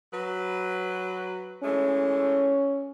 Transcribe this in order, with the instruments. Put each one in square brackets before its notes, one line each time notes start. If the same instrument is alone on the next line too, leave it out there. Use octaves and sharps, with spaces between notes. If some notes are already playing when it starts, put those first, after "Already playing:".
[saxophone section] F#3 B4
[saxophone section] E3 G#3 A3 [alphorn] C#4